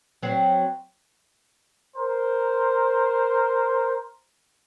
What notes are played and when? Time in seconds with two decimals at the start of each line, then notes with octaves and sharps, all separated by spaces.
0.23 F#3 C4
1.96 A#4 C5